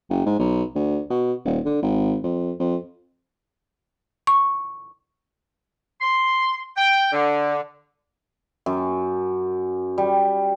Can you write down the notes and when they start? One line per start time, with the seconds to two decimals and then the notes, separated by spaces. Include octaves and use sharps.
0.10 F#1
0.26 G#2
0.39 B1
0.75 D2
1.10 B2
1.45 D#1
1.66 D3
1.83 G#1
2.24 F2
2.60 F2
4.27 C#6
6.01 C6
6.77 G5
7.12 D3
8.66 F#2
9.98 G3